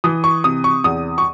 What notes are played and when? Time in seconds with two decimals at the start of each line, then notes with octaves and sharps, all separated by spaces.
0.04 E3 D#6
0.24 C#6
0.44 C3 D#6
0.64 C#6
0.84 E2 D#6
1.18 C#6